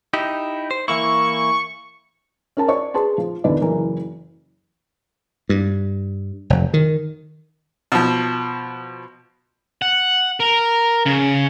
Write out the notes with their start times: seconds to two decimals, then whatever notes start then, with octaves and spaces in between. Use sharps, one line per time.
0.13 D#4 E4 G4
0.71 C5
0.88 E3 A#3 E4 C#6
2.57 C#4 A#4 A5
2.68 C#5 D5 C#6
2.94 G#4 B4 A5 C6
3.18 F3
3.44 E2 D3 D#3 E4 B4 D5
3.61 F#1 E3 A#4
5.49 G2
6.50 F1
6.74 D#3
7.92 B2 F3
9.82 F#5
10.40 A#4
11.06 C#3